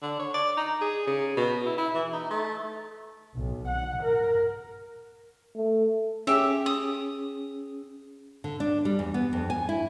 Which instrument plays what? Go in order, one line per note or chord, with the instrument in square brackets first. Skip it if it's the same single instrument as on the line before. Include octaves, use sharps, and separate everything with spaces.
[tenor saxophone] D3
C#5
D5
D#4
G#4
C#3
B2
E4
E4
E3
D#4
A3
[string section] B1
F#5
A#4
[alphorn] A3
[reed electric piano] C#4 G#4 [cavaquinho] G4 E5
[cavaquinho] D#6
[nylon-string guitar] D3
D4
G3
E2
B3
F2
G#5
E4